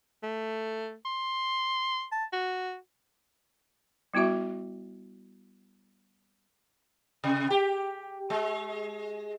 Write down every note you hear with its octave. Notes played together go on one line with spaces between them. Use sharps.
A3
C6
A5
F#4
G3 B3 E4 F#4 E5
C3
G4
G#3